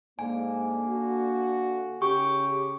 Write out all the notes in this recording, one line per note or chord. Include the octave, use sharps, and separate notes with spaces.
G#2 D3 A#3 G#5
F#4
C#3 G4 C#6